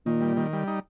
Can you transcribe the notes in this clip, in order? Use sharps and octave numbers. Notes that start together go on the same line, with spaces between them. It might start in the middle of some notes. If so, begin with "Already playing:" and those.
A#2 D#3
G3
D#3
G3
D#4